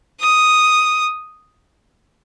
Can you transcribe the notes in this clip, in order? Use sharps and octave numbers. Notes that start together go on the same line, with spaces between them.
D#6